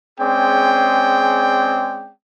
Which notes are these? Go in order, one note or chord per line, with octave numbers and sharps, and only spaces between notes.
G#3 C4 C#4 G#4 D5 G5